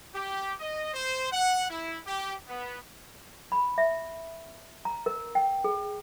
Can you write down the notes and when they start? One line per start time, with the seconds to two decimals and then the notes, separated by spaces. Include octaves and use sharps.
0.15 G4
0.60 D#5
0.94 C5
1.32 F#5
1.70 E4
2.07 G4
2.47 B3
3.52 B5
3.78 E5
4.85 A#5
5.06 A#4
5.35 G5
5.64 G#4